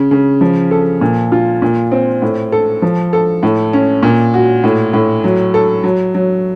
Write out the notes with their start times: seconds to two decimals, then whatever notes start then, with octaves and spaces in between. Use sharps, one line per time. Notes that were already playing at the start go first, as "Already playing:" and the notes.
Already playing: C#3
0.11 C#3
0.41 F3
0.71 A4
1.01 A#2
1.32 F4
1.62 A#2
1.92 C4
2.22 A2
2.52 A4
2.82 F3
3.13 A4
3.43 A2
3.73 C#4
4.03 A#2
4.34 F#4
4.64 A2
4.94 A2
5.24 F#3
5.54 A4
5.84 F#3
6.15 F#3